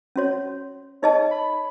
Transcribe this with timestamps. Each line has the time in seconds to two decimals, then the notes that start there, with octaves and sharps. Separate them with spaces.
0.16 C#4 F#4 C#5
1.02 D#4 G#4 C#5 D#5 A5
1.31 B5